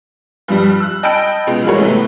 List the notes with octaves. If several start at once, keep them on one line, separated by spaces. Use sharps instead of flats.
G2 F3 G3
E6 F#6
D#5 G5 A5 B5 E6 D7
C#2 B2 G#3
E3 G3 G#3 F#4 A#4 C#5
A2 C3 A3 B3